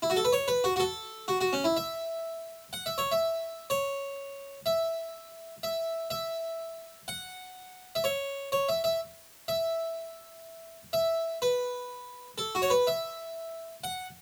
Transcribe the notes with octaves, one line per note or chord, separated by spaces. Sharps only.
E4
F#4
A4
B4
C#5
B4
F#4
F#4
A4
F#4
F#4
C#4
E4
E5
F#5
E5
C#5
E5
C#5
E5
E5
E5
F#5
E5
C#5
C#5
E5
E5
E5
E5
B4
A4
F#4
C#5
B4
E5
F#5